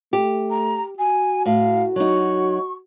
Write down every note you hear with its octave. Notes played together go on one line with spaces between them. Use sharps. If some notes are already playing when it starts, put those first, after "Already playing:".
A3 G4
A#5
F#4 G#5
A2 F5
F#3 D#4 C#6